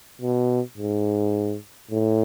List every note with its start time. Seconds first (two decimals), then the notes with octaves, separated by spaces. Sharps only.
0.22 B2
0.78 G#2
1.91 A2